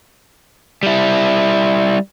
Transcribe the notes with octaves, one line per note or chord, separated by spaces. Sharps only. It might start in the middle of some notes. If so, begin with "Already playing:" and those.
G3 E4